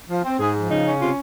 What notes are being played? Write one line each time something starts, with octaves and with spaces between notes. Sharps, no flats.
F3
C4
G#2 G#4
F3
C#3 D#4
C#4
C3 F4